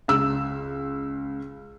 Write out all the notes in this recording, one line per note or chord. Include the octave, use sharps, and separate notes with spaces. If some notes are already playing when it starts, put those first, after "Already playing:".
C#2 E6